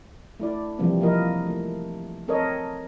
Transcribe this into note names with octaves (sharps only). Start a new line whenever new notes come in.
A3 E4 D5
C3 E3 F3 G3 A#3 C4
F3 A#3 E4 A#4 D#5
A3
C4 A4 A#4 C#5 D#5